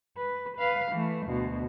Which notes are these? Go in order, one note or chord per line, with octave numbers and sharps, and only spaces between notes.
B4
B4 F5
E3 A3
D2 B2